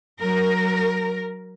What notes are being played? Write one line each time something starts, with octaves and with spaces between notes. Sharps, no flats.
F#3 A#4